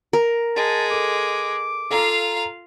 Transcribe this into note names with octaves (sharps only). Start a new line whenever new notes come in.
A#4
G#3 A5
A4 D6
F4 A4 F5 A#5